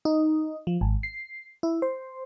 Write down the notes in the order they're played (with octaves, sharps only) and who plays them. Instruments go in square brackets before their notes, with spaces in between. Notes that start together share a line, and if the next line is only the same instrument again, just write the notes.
[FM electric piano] D#4
F3
G#1
C7
E4
C5